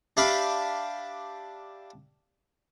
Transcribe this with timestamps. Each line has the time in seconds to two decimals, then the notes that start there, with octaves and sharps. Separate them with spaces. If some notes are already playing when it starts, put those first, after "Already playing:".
0.17 D4 G4 E5 F5 B5